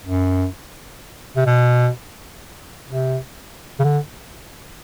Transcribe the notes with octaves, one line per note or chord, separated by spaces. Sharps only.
F#2
C3
B2
C3
C#3
D3